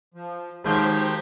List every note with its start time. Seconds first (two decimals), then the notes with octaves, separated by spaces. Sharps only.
0.14 F3
0.64 D#3 F3 F#3 G#3 G4 C5